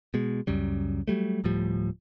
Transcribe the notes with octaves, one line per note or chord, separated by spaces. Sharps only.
B2 G#3
C#2 F#2 C#3 G3
F#3 G3 A3
D1 A2 F3 G3